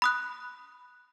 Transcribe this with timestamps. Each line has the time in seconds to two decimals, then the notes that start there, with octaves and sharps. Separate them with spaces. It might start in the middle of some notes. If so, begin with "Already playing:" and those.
0.02 B5 D#6 F#6